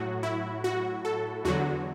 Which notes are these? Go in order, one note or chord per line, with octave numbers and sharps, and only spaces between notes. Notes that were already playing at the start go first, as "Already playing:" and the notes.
Already playing: A2 F#3 F#4
E4
F#4
A4
E2 D3 F#3 F#4